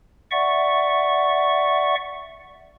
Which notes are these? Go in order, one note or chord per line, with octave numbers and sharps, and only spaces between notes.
D5 E5 F#5 C#6